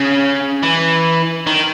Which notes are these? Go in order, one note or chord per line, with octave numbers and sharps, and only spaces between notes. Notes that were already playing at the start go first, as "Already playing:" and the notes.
Already playing: C#3
E3
D#3